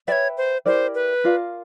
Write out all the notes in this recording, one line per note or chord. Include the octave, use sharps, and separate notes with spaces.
B4 C#5 D5 E5 G5
C5
E4 G4 A#4 C5 D5
B4
F4 A#4 D5 F5